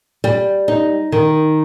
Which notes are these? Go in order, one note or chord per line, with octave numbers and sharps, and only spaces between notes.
G3
D#4
D#3